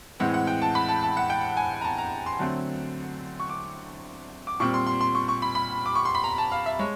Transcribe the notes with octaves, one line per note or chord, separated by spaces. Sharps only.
A2 E3 G#3 C4 F#5
F#5
G5
A5
B5
A5
A5
F#5
G5
G#5
A#5
A5
A#5
C6
D3 F#3 A3 C4
C#6
D6
D6
A#2 G3 C4 C#6
C6
C6
C6
C#6
C#6
B5
B5
D6
C#6
C6
B5
A#5
A5
F5
E5
G#3 C#5